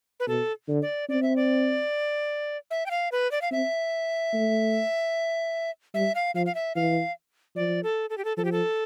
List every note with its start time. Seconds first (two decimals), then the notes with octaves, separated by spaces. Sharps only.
0.20 B4
0.27 B2 A4
0.68 D3
0.82 D5
1.09 C4 D5
1.23 E5
1.36 D5
2.71 E5
2.86 G5
2.91 F5
3.12 B4
3.31 D5
3.42 F5
3.51 C4 E5
4.33 A3
5.94 G3 E5
6.15 F5
6.35 F3 F5
6.46 F5
6.55 E5
6.75 E3 F5
7.56 F3 D5
7.83 A4
8.10 A4
8.18 G4
8.25 A4
8.37 F3 A4
8.45 G4
8.52 A4